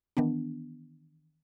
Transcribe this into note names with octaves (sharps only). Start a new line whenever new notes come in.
D#3 E3 B3 D4